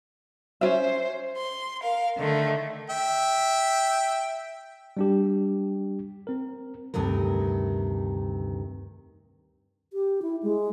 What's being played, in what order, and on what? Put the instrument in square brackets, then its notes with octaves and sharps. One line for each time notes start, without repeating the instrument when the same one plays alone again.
[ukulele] C#4 F4 E5 [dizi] C5
[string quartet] C6
A#4 F5
D3 D#3 A3
[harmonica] E5 G5
[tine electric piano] G3 D4 G4
C4 A#4
[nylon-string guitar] D2 G2 C3 D#3 A#4
[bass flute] G4
E4
G#3